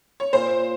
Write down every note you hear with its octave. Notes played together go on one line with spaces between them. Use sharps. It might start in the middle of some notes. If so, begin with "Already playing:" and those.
C#5
A#2 C5